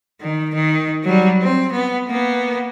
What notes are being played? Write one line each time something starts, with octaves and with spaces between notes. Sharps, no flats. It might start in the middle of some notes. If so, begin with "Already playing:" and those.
D#3
D#3
F#3 G3
C4
B3
A#3 B3